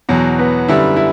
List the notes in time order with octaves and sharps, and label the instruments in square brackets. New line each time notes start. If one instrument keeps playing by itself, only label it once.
[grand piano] E2 B2 F#3
[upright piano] B3
[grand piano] F#2 D3 G3 [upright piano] E4
[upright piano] E4